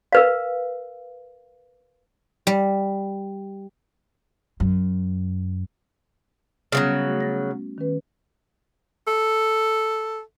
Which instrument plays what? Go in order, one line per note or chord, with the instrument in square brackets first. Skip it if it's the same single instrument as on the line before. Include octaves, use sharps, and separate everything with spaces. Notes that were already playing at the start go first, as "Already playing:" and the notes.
[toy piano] A#4 B4 F5
[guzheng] G3
[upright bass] F#2
[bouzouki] C#3 E3 F#3 [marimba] G3 B3 C#4
[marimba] A3 F#4
C#4 A6 A#6
D#3 C#4 B4
[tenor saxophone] A4